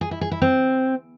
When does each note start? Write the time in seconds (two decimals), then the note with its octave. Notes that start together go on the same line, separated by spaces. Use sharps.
0.01 G#4
0.11 E4
0.21 G#4
0.31 E4
0.42 C4